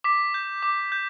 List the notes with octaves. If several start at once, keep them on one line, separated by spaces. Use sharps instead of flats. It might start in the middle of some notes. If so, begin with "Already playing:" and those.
D6 B6
G6
D6
G6